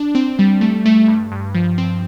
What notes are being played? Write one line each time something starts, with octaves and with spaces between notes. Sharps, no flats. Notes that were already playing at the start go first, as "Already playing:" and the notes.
Already playing: D4
C4
G3
A3
A3
G2
G2
F3
C4